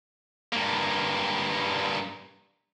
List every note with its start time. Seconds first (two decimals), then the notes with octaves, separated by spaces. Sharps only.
0.53 G2 A#3